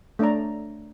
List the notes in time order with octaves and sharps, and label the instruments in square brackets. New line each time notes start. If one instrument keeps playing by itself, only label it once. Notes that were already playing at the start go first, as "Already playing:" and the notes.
[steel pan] A3 D4 C#5 D5 A#5